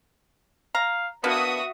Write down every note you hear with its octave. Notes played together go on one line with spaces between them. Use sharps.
F5 A#5
A#3 B3 D4 F#4 B4 E5 D#6